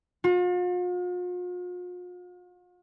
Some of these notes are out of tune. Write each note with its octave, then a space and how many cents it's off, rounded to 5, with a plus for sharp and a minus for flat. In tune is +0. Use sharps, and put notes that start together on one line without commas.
F4 +45